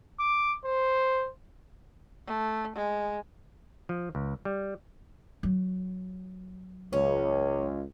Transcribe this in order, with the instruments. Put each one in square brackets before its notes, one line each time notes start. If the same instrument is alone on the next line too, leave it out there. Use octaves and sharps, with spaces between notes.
[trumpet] D6
C5
[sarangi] A3
G#3
[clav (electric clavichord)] F3
C#2
G3
[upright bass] F#3
[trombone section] C#2 [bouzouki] C#4